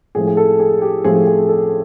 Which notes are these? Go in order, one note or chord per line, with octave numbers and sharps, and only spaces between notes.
A2 F3 A3 C4 G#4
G#4
A4
G#4
G4
A2 F3 A3 C4 G#4
G#4
A4